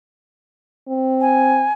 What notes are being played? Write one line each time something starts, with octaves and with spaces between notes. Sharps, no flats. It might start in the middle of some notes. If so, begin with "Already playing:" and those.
C4
G#5